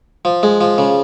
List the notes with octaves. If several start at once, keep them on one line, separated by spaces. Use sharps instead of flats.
F3
G#3
F3
C#3